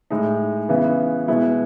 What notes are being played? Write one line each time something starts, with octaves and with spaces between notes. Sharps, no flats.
A2 G#3 D#4
C#3 E3 B3
B2 G#3 B3 E4